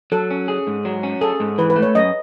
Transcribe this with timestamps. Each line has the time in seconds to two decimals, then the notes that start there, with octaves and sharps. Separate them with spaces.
0.12 F#3 A4
0.31 C#4
0.48 G#4
0.67 G#2
0.85 F#3
1.03 C#4
1.21 G#4 A4
1.40 G#2
1.58 E3 B4
1.70 B4
1.76 A3
1.82 C#5
1.95 F#2 D#5